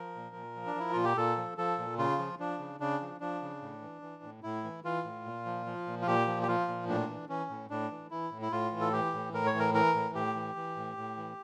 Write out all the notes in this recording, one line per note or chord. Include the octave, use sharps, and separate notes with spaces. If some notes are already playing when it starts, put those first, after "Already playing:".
Already playing: F3 A#4
A#2
A#2
F3
D4
F3 E4
A#2 F4
G4
A#2 A4
F3
F3 A4
A#2
C#3 F4
F3
F3 D4
C#3
C#3 D4
F3
F3 D4
C#3
A2
E3
E3
A2
A2 E4
E3
E3 F4
A2
A#2
F3
F3
A#2
F4
A#2 G4
F3
G4
F3 F4
A#2
A2 D4
E3
E3 C#4
A2
A2 D4
E3
E3 E4
A2
E4
A2 F4
E3
A4
E3 G4
A2
A2 A#4
C#5
E3
A#4
E3 A#4
A2
A2 G4
E3
E3
A2
A2
E3